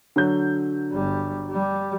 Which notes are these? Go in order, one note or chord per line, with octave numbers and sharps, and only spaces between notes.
D3 F#3 G6
G1 G3
G3